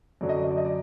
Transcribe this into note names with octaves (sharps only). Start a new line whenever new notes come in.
F#2 D3 F#3 D5
D#5
D5
D#5
D5
D#5
D5